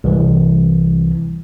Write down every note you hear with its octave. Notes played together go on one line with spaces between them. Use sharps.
C2 E3